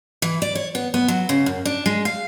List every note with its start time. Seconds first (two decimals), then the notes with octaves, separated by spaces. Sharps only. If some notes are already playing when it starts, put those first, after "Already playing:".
0.22 E3
0.42 D5
0.55 C#5
0.75 B3
0.94 B3
1.08 F#3
1.29 C#3
1.46 F#2
1.65 D4
1.86 G#3
2.05 F5